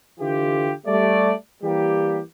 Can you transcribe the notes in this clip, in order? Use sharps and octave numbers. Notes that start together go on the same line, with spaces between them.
D3 E3 F4 G4
G3 A3 D5
E3 G3 A#3 G4